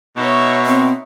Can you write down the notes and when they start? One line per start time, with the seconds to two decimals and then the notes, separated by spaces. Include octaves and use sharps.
0.17 B2 D#4 C#5 E5
0.66 C4